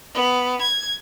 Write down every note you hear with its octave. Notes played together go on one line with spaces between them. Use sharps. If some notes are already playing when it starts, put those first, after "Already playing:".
B3
G#6